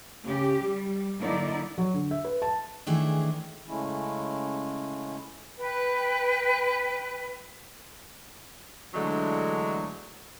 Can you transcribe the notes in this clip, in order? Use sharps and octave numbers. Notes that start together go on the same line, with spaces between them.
C#3 G4
G3
D3 F#3 A#3 D#4 E4 D5
F#3
D3
E5
B4
A5
D#3 E3 A3 D4 G#4
C#3 G#3 A3 C#4 E4
B4 G5
D3 E3 F#3 G#3 A3 D4